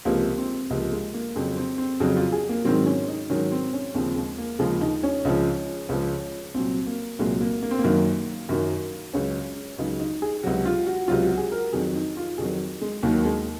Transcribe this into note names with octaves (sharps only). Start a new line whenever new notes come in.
C#2 C3 F3 A#3
C4
C#2 C3 F3 A#3
G#3
A#3
F2 C#3 F#3 C4
C4
C4
F2 C#3 F#3
F4
G#4
A#3
G#2 D#3 F#3 C4
C#4
D#4
G#2 D#3 F#3 C#4
C4
C#4
D#2 C#3 F3 C4
G#3
A#3
D#2 C#3 F3 G#3
D#4
C#4
C#2 C#3 F3
C#2 C#3 F3
C2 A#2 F#3 C4
A#3
C2 A#2 F#3 G#3
A#3
A#3
C4
A#3
F#2 D#3 F#3
F#2 D#3 F#3
C#2 C#3 F#3 C#4
C#2 C#3 F#3 D#4
D#4
G#4
C#2 C3 F#3 F#4
F4
F#4
C#2 C3 F#3 F4
F#4
G#4
A#4
F2 D#3 F#3 G#4
D#4
F4
F2 D#3 F#3 G#4
G#3
D#2 D#3 F#3 A#3
G#3